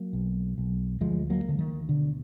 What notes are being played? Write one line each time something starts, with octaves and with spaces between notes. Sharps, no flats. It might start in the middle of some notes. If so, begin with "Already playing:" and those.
Already playing: F#3 A#3
B1
B1
D2 F3 G#3
F#3 A#3
D2 D3
D#3
B2 D3